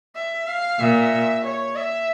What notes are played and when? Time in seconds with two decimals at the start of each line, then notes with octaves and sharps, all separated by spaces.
0.16 E5
0.47 F5
0.79 A#2 E5
1.44 C#5
1.76 E5